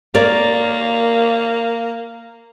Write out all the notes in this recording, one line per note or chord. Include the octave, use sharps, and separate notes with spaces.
A#3 A#4 C#5 D5